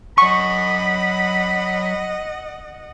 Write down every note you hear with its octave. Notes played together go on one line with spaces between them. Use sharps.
F#3 D#5 F#5 G#5 B5 C#6